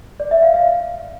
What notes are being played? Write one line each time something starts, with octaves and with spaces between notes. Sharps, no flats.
D5
E5
F5
F5